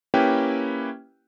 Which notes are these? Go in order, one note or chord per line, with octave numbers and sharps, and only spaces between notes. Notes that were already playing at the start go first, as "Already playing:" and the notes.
A#3 C#4 E4 G4 B4 G5